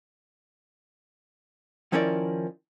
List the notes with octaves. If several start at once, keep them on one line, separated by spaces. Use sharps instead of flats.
D#3 F3 C#4 E4 A#4 D5